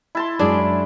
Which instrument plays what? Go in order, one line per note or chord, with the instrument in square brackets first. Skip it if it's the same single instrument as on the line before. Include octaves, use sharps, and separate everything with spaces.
[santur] E4 A5 C6
[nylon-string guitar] F#2 G#3 F#4 [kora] D4 G#4